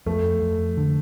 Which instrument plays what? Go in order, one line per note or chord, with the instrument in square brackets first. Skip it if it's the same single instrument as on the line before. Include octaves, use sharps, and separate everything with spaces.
[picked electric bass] F2 [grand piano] A3
[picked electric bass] F2
D3